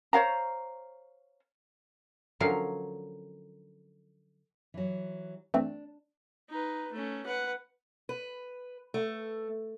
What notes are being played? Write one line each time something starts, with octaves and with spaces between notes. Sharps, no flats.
C5 C#5 F5 A#5
D3 F3 F#3 C#4 A#4 F5
E3 F#3
E3 A3 C4 D4
D#4 B4
A3 C#4
B4 F#5
B4
A3